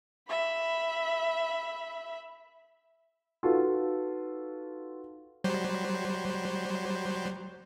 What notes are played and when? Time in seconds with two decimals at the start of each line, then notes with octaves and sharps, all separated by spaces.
0.28 E5 B5
3.43 D#4 F4 F#4 A4 B4
5.44 F#3 G3 C5